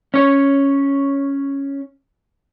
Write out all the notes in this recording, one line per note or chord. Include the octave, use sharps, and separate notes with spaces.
C#4 C#5